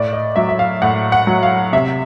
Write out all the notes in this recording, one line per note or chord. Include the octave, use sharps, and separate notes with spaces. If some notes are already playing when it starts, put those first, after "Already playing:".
Already playing: A2 D5
D#5
F#3 E5
E5
F5
A2 F#5
F#5
F#3
F5
C3 E5